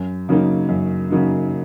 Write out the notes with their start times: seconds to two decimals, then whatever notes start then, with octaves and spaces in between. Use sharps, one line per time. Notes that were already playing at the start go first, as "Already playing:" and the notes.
Already playing: F#2
0.29 C#3 F#3 A#3 D#4
0.69 F#2
1.10 C#3 F#3 A#3 D#4